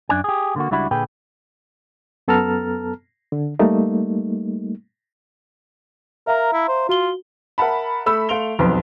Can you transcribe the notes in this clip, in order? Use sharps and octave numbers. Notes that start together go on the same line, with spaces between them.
F#2 D4 D5 G#5
G4 G#4
D3 A#3 F#4
C#2 G3 D4 E4 F#4 B5
A#2 D3 G#4 B4 G5
F#2 B3 A4 A5 A#5 F6
D3
G3 A3 A#3 D#4
A#4 E5 F5 A#5
E4
C5
F4 F#4 G7
A#4 E5 F#5 A5 B5
A3 B5 E6
A3 F5 C6 D7 F7 G7
E1 B1 F2 B4 C6